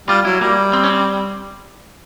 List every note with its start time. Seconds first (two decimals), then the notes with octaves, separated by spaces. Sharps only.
0.08 G3 F4
0.25 F#3 E4
0.41 G3 A#3
0.73 C4
0.84 C#4
0.89 C4